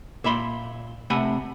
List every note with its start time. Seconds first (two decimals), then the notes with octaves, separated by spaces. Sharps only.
0.24 A#2 E5 B5 C6
1.10 C3 A3 F#5 G#5 B5